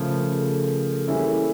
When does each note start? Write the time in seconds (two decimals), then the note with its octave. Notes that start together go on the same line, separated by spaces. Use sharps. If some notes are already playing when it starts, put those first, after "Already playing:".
Already playing: C#3 F3 A3 A#4
0.32 G#4
0.37 A4
1.02 A4
1.06 E3 G3 A#3 C#4 E4 G#4